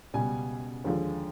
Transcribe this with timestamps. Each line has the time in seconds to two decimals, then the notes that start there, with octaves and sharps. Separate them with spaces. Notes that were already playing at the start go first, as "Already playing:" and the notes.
0.14 C#2 B2 G3 G#5
0.84 D#2 D3 F3 G#3